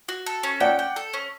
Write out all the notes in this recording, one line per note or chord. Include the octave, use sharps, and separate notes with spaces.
F#4
A4
C#4
D5 F#5 G5
G5
A4
C#4